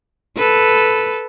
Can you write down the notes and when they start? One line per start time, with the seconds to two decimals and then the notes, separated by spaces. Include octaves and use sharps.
0.37 A4 B4